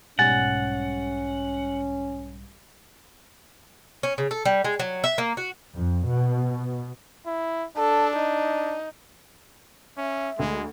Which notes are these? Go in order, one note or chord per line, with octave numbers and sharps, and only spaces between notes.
B1 G#2 G3 C#4 F#5 G#5 A6
C#4
C#3
A4
G3
G#3
F#3
E5
A#3
F#4
F2
B2
E4
D4 A4
D#4
C#4 E5
D2 G#3